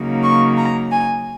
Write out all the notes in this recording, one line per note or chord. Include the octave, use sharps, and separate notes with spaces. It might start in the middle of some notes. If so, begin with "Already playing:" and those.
Already playing: C#3 F#3 A#3 D#4
C#6
A#5
G#5